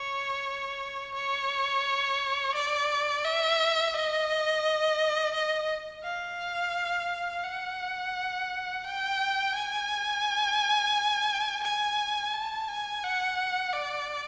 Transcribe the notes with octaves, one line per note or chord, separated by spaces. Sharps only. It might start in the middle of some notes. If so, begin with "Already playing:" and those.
Already playing: C#5
C#5
D5
E5
D#5
D#5
F5
F#5
G5
G#5
G#5
A5
G#5
F#5
D5